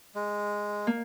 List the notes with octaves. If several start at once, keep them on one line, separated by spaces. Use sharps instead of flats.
G#3
A#3